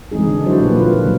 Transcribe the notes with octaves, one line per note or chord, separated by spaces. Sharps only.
E3 G#3 C4 D#4 G#4
D3 D4
F#3 D4 E4 F#4 C5 D5
A#2 D3 F3 A#3 G4 B4
A#3 F4 B4
D3 F#3 A#3